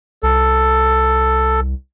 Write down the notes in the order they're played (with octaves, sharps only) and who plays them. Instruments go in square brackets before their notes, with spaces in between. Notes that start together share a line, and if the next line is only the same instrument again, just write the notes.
[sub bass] C2 [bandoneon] A4